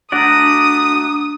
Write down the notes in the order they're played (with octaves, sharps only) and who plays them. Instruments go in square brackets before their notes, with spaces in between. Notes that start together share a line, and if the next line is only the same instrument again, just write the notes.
[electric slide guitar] A3 F#4 D5 [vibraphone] D4 A#5 [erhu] D#6